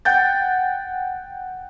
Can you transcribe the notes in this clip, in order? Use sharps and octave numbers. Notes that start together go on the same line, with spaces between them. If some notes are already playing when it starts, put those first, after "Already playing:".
F#5 G5 G6 A6